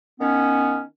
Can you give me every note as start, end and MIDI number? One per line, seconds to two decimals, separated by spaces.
0.21 0.82 51
0.21 0.82 59
0.21 0.82 61